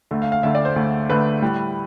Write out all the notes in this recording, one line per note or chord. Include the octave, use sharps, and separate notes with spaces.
D2 D3 A3
F5
F5
D2 D3 A3 E5
D5
C5
D2 D3 A3
D2 D3 A3 B4
A2 G3